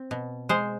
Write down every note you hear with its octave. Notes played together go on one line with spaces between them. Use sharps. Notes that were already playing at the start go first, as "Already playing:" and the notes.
Already playing: C4
B2
G#3 C5